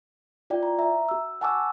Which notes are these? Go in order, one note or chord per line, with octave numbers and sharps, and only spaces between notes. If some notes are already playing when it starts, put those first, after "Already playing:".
E4 F4 D5 G5
A#5
E5 A#5
F#4 E6
F#5 G#5 A5 C#6 D6 E6